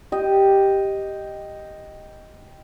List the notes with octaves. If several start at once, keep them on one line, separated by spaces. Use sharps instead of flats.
G4 D#5